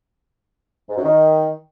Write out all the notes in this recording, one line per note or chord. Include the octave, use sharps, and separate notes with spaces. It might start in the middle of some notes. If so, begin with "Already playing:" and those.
G#2
F#2
D#3